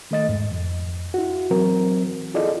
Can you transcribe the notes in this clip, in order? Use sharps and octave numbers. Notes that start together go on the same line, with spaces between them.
D#3 A3 D#5 A6
E2 G#2
F2
E4 F#4
E3 F#3 C4 A#4
E4 F4 G#4 A4 D5 D#5